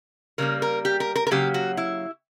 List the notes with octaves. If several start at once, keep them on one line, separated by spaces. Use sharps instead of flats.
C#3 G3 A#3 A#4
A#4
G4
A#4
A#4
A#4
C#3 F#3 A#3 G4
F#4
E4